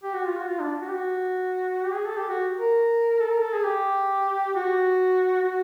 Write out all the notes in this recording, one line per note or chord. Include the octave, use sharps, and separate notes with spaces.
G4
F#4
F4
F#4
F4
D4
F#4
G4
F#4
G4
G#4
A4
G4
F#4
A#4
A4
A#4
A4
G#4
G4
F#4
F#4